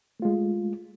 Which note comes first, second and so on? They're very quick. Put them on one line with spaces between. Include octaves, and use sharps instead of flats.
A3 F4 G#3